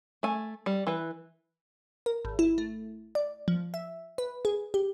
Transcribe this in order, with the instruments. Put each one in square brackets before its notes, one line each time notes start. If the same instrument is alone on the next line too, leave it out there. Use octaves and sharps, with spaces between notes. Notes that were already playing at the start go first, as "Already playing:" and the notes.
[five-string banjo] A3 G#5
G3
E3 B4
[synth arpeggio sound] A#4
G#1
E4
A3
D5
F3
E5
B4
G#4
G4